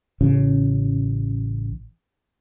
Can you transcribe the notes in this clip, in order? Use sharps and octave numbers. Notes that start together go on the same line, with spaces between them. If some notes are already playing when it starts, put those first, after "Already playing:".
A1 C#3